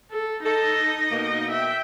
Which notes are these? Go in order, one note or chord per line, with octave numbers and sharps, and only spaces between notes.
A4
D#4 A4 D#5
B2 A#3
E5 G5